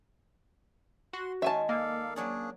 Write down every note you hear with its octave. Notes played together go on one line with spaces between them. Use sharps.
F#4 C6
D#3 G#3 C#4 E5 G#5 A5
A#3 A4 D5 F5
F#3 C#4 D4 G#4 C#5 D5